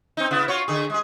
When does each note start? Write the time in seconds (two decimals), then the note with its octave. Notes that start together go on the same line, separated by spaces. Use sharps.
0.17 C4 D#4
0.31 C#3 B3 E4
0.48 F4 F#4 C#5
0.68 D3 G#4
0.90 G#3 G#4